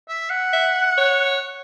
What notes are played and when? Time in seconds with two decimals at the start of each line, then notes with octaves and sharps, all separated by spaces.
0.09 E5
0.30 F#5
0.53 E5
0.98 C#5